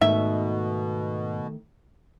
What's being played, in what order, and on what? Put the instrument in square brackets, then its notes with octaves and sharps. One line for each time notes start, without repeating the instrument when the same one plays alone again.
[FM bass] G#2 [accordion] B2 [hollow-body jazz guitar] D#3 A3 D#4 [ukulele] E5